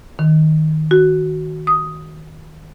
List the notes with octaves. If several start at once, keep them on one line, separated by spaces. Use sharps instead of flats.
D#3
F#4
D#6